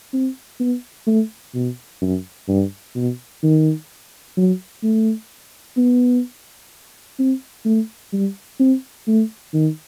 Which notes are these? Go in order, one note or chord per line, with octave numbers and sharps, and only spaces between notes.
C4
B3
A3
B2
F#2
G2
B2
D#3
F#3
A3
B3
C4
A3
G3
C4
A3
D#3